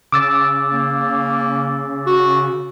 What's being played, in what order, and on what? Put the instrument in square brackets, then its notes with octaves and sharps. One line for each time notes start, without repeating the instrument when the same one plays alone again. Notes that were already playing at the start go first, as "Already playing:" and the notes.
[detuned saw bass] C#3 [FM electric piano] D6 E6 A6
[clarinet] A#3
F#4